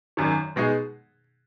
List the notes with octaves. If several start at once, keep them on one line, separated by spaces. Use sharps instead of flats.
G#1 F#2 D#3
B2 G#3 D#4 G#4